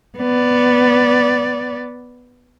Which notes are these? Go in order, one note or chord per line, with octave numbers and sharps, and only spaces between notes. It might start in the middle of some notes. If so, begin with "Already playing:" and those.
B3 D5